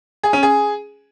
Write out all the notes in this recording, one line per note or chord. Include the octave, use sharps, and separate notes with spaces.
G#4
C#4
G#4